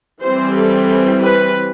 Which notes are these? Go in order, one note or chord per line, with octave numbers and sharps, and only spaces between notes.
E3 G3 C4 C5
A4
B4